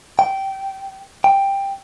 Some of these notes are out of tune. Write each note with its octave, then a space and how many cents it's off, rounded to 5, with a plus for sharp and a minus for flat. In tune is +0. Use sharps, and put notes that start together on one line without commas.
G5 -15
G5 +10